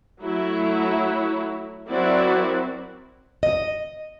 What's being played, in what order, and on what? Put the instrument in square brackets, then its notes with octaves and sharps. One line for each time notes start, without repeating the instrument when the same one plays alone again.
[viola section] F#3 A3 E4
F#3 C4 E4 F#4 A#4 D5
[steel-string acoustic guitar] D#5